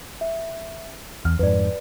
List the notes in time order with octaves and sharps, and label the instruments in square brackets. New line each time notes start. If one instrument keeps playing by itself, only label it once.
[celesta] E5
[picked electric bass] E2 [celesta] F6
[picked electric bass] F2 G#2 [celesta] B4 D5